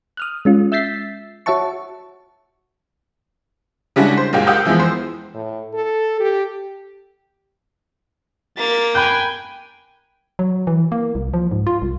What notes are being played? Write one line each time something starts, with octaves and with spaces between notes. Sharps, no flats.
D#6 F6 F#6
G#3 C#4 F4
E5 E6 G6 A6 B6 C7
F#4 C#5 E5 F#5 A5 C#6
C#3 G3 G#3 D4 E4 F#4
C5
F#1 A#2 G#3 G4 F5
G4 F5 F#5 D#6 E6 G6
E2 E3 F3 G#3 B3
C5
A2
A4
G4
A#3 A6
G5 G#5 B5 F#6 G6
F#3
E3
A#3
C2
F3
G#2
F4
C2